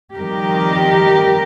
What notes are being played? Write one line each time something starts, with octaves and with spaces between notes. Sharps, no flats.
F2 D#3 G3 G4 A#4